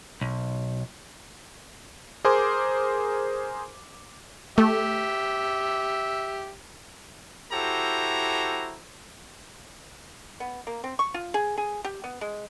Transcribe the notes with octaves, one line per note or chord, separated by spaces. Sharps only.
B1
G#4 A#4 C5 G#5 C6 D6
A3 G4 E5
E4 F#4 G4 A4 C5 A#5
B3
A#3
C4
C#6
F4
G#4
G#4
G4
B3
G#3